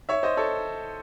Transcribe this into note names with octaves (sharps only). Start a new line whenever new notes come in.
C#5 E5
C5 D#5
A4 C#5